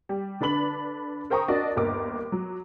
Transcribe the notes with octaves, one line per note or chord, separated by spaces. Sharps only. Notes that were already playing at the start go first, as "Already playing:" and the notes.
G3
D3 D4 B4 B5 F#7
A#4 C5 G5 A#5 C#6 D#6
D4 F#4 A#4 D5 D#5
G1 D#2 A#4 D6
F#3